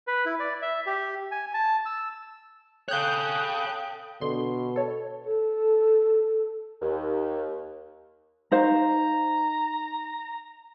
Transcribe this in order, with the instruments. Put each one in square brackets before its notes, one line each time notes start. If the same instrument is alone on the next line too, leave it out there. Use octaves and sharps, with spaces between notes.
[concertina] B4
E4
D5
E5
G4
G#5
A5
E6
[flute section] A4 G5 D#6 [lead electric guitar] C#5 F5 [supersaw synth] F#6 G6
[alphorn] B2 [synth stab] D3 C6
[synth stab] A4 C#5
[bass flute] A4
[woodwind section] D#2
[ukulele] D#4 C5 F5 [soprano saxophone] A#5